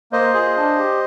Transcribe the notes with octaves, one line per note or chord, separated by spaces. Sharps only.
A#3 C5 D#5
F4 G#4
D4
G4